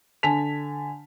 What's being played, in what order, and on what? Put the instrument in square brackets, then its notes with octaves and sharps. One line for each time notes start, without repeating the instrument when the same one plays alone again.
[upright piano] D3 G#5 A5 B6 F7